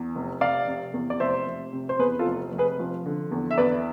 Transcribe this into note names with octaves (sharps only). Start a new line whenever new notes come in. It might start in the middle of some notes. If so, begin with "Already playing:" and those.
Already playing: E2
F1
F1 D5 F5
C3
E2
D5
F1 C5 E5
F1
C3
C5
E2 G#4 B4
F4 A4
F1
F1
G#4 B4
F3
D3
E2
E5
E2 B4 D5